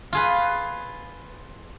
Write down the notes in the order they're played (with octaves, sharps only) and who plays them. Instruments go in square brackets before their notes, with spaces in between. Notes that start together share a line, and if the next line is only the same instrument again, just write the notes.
[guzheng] F4 G#4 B4